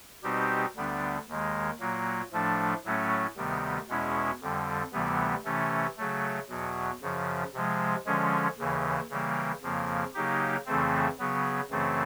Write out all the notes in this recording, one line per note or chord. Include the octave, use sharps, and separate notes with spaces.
B2 G3 C4 D#4 G4
D2 D3 G3 B3 D4
D#2 D#3 G#3
A#2 F#3 A#3
A2 F3 A3 D4
A2 F#3 A3 C#4
D2 C3 D#3 G3 B3
E2 B2 G#3 C#4 E4
F2 D3 G3
D2 C3 E3 G3 B3
C3 E3 A3 C#4
C#3 F#3 A3
E2 B2 F#3
F#2 C#3 F3
C3 F3 G#3
D3 F3 G#3 C#4
D#2 C#3 E3
C#3 E3 G3 A#3
F2 C#3 F3 A#3
C#3 F#3 A#3 D#4 G4
F2 C#3 E3 A3 C4
C#3 F#3 B3
F#2 C#3 E3 A3 C4